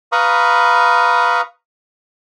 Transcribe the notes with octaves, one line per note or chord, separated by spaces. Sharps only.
B4 F5 A#5 B5 C#6 D#6